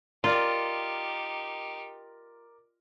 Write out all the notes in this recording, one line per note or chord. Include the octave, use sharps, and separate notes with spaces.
D#4 F4 G4 A#4 D5